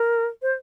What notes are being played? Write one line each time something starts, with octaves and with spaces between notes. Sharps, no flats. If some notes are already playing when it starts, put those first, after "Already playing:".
Already playing: A#4
C5